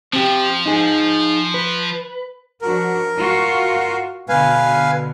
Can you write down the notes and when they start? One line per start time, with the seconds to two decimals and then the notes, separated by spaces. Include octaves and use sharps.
0.13 F3 C4 G4
0.66 D#4 G#4
1.54 B4
2.62 F3 D4 F#4 A#4
3.16 F4 F#4 F5
4.29 B2 D3 B4 F5 G#5